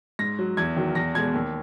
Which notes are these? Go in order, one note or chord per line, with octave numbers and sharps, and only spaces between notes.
G#2 A#6
F#3
E2 G#6
D#3 F#3
E2 A#6
B2 G#3 G#6
D#2